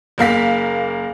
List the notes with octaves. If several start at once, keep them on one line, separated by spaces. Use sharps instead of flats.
F#1 A#3 F5 B6